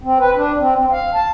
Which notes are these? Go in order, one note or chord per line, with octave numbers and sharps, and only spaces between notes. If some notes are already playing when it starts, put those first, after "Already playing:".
C4
B4
D4
C4
C4
F5
A5